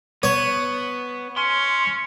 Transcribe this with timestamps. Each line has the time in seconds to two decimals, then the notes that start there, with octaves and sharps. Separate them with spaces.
0.23 B3 C#5
1.38 C#4 C6